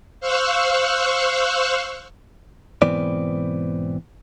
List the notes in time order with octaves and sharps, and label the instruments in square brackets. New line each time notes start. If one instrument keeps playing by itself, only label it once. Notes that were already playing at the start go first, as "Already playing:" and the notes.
[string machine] C5 F5 C#6 E6 F#6
[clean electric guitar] B1 G#2 E3 B3 C4 D5